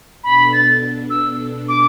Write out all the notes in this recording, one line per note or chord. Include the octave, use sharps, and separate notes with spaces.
B2 B3 D4 A4 B5
A6
E6
D6